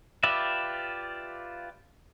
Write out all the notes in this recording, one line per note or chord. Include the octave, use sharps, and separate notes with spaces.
F4 G4 B4 D5 E5